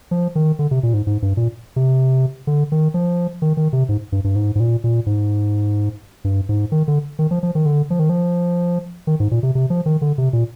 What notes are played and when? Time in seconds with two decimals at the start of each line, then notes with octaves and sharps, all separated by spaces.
0.11 F3
0.35 D#3
0.59 D3
0.71 C3
0.83 A#2
0.94 G#2
1.07 G#2
1.22 G2
1.37 A#2
1.76 C3
2.47 D3
2.72 D#3
2.94 F3
3.42 D#3
3.57 D#3
3.73 C3
3.89 G#2
4.12 G2
4.24 G2
4.36 G#2
4.55 G#2
4.60 A#2
4.84 A#2
5.06 G#2
6.24 G2
6.49 G#2
6.72 D#3
6.88 D3
7.19 D#3
7.31 F3
7.43 F3
7.55 D#3
7.66 D3
7.90 F3
7.99 D#3
8.09 F3
9.07 D#3
9.20 G#2
9.31 A#2
9.43 C3
9.55 C3
9.70 F3
9.86 D#3
10.01 D3
10.18 C3
10.33 A#2